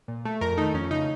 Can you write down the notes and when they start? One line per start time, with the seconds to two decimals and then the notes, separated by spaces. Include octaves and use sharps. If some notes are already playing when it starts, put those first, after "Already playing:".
0.08 A#2
0.25 A3
0.41 F2 A#4
0.57 D#3 A3 D#4
0.74 F2 C#4
0.90 C#3 A3 D#4